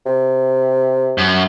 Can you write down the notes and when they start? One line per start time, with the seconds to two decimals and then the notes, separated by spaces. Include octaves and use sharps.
0.06 C3
1.18 F#2